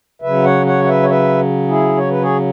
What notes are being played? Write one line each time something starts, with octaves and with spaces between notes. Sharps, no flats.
C#3 F#3 B4 E5
C#5 F#5
C#5 F#5
F#5
B4 E5
C#5
B4 E5
E4 G#4
C#5
B4
G#4 C#5